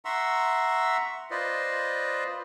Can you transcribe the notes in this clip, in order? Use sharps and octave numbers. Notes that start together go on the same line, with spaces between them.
E5 F#5 A#5 C6 C#6 E6
F4 B4 C5 D5 D#5